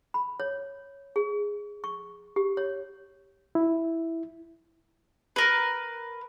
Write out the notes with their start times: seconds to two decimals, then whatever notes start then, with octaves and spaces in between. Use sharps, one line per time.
0.14 B5
0.40 C#5
1.16 G#4
1.84 C#6
2.36 G4
2.57 C#5
3.55 E4
5.36 A#4 B4